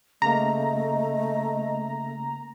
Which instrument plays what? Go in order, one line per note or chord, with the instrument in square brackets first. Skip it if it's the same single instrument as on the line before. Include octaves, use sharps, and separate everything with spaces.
[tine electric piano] C#3 A#3 [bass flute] A3 [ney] D#5 [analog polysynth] A#5